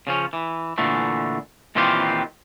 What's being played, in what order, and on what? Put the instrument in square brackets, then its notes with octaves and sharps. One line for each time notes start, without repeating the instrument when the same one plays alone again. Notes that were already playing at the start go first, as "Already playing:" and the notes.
[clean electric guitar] C#3 F3 C#4
E3
A#2 D3 E3 A3
A#2 D#3 E3 C4 F4 G4